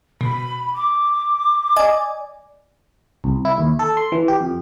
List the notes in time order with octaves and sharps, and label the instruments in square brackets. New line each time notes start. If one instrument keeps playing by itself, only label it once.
[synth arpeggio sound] B2 [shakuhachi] B5
[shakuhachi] D6
[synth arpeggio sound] D5 D#5 G#5
[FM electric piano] C2
E4
D#2
A4
C6
E3
G4
F2